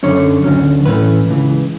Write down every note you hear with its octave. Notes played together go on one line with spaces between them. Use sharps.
F#2 D3 F#3 C#4 C#5
D2 D3 F#3 C#4
A2 E3 A3 C#4 B4
C#2 C#3 E3